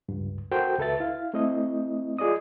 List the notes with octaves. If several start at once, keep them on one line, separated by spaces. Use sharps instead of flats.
C#2 G2
F#4 A4 A#4 C5 G5
C#2 A4 B4 E5 A6
E4 F5
A3 C4 E4 D#5
F4 G#4 D5 D#5 D#6